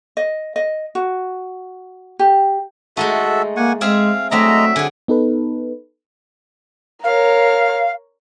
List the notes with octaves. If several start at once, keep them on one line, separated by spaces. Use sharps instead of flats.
D#5
D#5
F#4
G4
G#3 A3 D#4 F#4 A4 E5
A#3 F#5 G#5 C#6
G#3 C4 G#4 E5 F5
F#3 G#3 A3 C4 D4 D#5 E5 A#5
D3 G#4 G#5
B3 D#4 A4 B4
A#4 C#5 F5